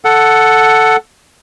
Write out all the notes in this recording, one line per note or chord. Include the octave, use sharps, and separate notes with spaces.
A4 F#5